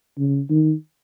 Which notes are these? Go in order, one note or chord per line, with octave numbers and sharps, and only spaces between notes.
C#3
D#3